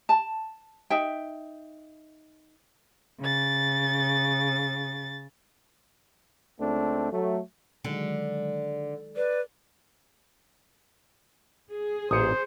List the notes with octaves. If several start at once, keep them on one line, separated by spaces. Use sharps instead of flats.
A5
D#4 E5 G5
C#3 A6
C#2 A3 C4 D4
F#3 A3
D3 D#3 F#3 G#3
B4 D5
G#4
A1 A#2 C5 C#5 D#6 C#7